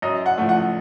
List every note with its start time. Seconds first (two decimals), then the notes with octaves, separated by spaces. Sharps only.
0.02 F#2 D#5
0.26 F#5
0.38 F3 A3
0.49 F#5